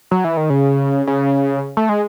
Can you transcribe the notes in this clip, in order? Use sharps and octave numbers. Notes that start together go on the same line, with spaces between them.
F#3
E3
D#3
C#3
C#3
A3
G#3